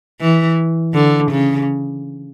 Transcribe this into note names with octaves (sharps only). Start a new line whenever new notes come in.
E3
D3
C#3